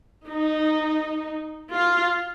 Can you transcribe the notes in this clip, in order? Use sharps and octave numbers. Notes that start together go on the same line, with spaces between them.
D#4
F4